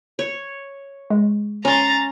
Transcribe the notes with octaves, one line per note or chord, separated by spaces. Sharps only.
C#5
G#3
C#4 A#5 C6 A6